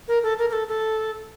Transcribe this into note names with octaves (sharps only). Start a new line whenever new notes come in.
A#4
A4
A#4
A#4
A4
A4